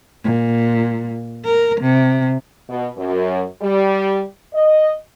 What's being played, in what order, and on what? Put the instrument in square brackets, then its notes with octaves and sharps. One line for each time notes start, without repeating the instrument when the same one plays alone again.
[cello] A#2
A#4
C3
[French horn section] B2
F#2
G3
D#5